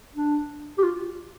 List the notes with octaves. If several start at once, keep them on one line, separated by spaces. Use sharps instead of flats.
D4
G4
F4